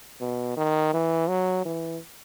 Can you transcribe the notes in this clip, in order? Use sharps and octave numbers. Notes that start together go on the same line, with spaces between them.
B2
D#3
E3
F#3
E3